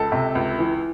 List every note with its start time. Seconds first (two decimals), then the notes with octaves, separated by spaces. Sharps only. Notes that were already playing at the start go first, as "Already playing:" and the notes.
Already playing: C#2 A4
0.12 C3
0.35 C#2
0.59 E3